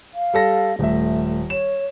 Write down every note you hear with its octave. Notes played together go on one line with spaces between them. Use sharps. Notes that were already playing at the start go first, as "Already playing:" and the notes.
F5
G3 A4 A#6
D#1 A3 E5
C#5 E7